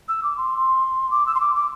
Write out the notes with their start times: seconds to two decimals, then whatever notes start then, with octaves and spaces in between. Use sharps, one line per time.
0.08 E6
0.23 D6
0.37 C6
1.11 D6
1.26 E6
1.35 C6
1.40 D6
1.56 D6